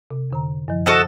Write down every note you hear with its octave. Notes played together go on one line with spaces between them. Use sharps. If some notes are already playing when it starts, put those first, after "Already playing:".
C3
F2 D3 A#5
F#2 F3
F#4 A4 C5 D#5 F6